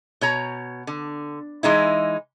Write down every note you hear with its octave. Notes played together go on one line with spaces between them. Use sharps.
B2 C#5 A#5
D3
E3 G#3 D#4 E4